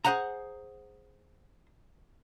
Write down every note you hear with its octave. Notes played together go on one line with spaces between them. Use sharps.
G#4 A4 C5 F#5 G#5 A#5